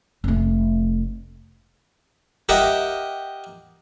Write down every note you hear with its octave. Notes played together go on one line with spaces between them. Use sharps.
F1 A3
G4 A#4 D#5 E5 F#5 G5